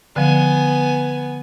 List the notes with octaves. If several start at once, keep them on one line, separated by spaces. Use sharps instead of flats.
D3 F3 B3 G#5